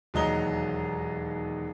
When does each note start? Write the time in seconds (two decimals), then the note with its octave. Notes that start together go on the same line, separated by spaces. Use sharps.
0.14 E1 D#2 F#3 D#5 A#5 G7